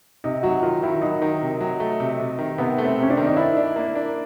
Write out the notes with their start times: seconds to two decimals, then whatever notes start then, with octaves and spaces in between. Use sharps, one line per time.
0.24 C3 D#4
0.43 F#3 F#4
0.63 D#3 F4
0.83 D#3 E4
1.02 F#3 D#4
1.22 D#3
1.42 C3
1.61 F#3
1.80 A3
2.00 C3
2.19 C3
2.39 D#3
2.58 C3 B3
2.78 A3
2.85 C4
2.98 C3 C#4
3.10 D4
3.17 D#3
3.27 D#4
3.36 D4 E4
3.57 D4
3.76 A#3
3.95 D4